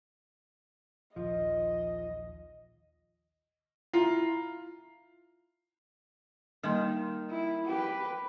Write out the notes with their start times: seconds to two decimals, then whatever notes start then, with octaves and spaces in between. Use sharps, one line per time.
1.16 A#1 D#2 F3 D#5
3.94 E4 F4 A#5 C7
6.63 D#3 G3 A#3 C6
7.30 E4
7.66 G4 B4